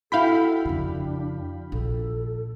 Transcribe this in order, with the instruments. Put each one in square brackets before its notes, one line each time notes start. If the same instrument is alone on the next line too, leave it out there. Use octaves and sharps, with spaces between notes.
[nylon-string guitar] E4 F#4 [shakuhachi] A4 [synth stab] F5 G5 B5
[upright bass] F2 C#3 [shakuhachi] D4
[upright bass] A#1 [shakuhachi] A4